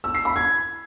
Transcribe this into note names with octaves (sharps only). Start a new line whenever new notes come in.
E6
C7
B5
G#6